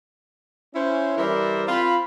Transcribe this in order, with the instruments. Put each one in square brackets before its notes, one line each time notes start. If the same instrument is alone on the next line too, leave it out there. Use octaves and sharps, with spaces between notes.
[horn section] C#4 E4 C5
E3 G3 E4 A#4 C5 D5
C4 F4 B5